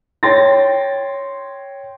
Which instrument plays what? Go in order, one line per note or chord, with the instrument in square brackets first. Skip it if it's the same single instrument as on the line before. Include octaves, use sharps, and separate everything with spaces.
[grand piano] C#5 G5 C6 A6 A#6